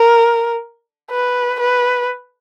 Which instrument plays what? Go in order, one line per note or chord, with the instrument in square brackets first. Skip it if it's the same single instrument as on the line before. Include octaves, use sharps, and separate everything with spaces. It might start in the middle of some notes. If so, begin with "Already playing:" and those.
Already playing: [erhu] A#4
B4
B4